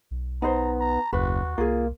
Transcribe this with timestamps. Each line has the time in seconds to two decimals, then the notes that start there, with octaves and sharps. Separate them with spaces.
0.11 B1
0.42 B3 D#4 C5 A#5
0.80 A#5
1.13 F#1 D#2 F#4 B4
1.58 C2 A#3 F4 G#4